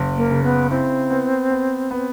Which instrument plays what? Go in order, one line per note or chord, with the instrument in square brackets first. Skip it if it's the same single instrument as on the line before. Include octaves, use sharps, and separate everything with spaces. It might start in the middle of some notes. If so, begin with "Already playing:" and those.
Already playing: [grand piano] F#1
[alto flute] A#3
[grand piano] C#3
[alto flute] B3
[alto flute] C4 [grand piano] E4
[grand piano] B3
B3
B3